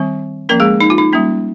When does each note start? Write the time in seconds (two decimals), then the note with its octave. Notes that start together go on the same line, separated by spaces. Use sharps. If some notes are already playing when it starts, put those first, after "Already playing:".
Already playing: D#3 G3 C4
0.49 F3 A#3 C#4 A#4
0.60 G#3 G#4
0.81 D#4
0.90 F4
0.98 D#4
1.13 G3 A#3 C#4